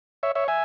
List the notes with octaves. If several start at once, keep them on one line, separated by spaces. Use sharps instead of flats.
C#5 E5
C#5 E5
E5 G#5